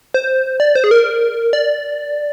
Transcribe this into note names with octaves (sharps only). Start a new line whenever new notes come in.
C5
D5
C5
G#4
A#4
D5